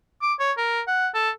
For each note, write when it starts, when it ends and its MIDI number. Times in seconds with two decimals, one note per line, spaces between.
0.22 0.34 86
0.40 0.52 73
0.58 0.81 70
0.88 1.08 78
1.15 1.30 69